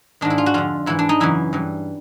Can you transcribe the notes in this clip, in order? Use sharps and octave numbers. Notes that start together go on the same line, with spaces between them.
G#2 D#3 D4
E4
F4
F#4
F2 D3 F4
G#2 E3 E4
D4
D#4
F#2 C#3 E3 E4
G2 E3